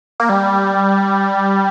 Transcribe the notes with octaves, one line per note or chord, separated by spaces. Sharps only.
A#3
G3